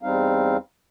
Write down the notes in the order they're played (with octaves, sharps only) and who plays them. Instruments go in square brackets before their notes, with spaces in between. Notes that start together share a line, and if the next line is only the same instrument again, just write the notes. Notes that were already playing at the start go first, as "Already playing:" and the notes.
[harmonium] E2 G3 C4 D#4 F5